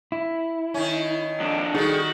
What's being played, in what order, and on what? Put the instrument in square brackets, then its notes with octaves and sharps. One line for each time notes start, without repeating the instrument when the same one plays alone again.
[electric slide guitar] E4
[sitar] D#3 C#4
[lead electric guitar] F2 D4
[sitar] D#3 G3 [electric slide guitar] D#4 G#4 A4 [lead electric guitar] F#4